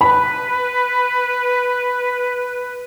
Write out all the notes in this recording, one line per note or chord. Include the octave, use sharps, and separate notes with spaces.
B4 B5